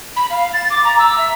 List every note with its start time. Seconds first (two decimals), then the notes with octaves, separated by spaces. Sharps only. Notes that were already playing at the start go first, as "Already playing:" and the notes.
0.16 B5
0.30 F5
0.53 A6
0.70 D6
0.85 A#5
0.99 E6
1.18 E5